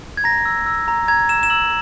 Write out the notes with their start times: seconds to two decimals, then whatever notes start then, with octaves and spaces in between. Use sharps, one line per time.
0.17 G#6
0.24 A#5 A#6
0.45 E6
0.66 E6
0.88 A#5
1.08 A#5 G#6
1.29 E6 E7
1.43 E7
1.50 E6 F#7